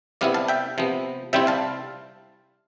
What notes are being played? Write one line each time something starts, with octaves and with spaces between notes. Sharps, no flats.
C3 G3 B3 E4 D5 F5
F5 A5
E5 G5
C3 F3 B3
C3 G3 C4 E4 E5 G5
F5 A5